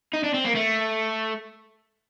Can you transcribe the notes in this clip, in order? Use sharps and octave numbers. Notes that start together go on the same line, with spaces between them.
D#4
D4
C4
A#3
A3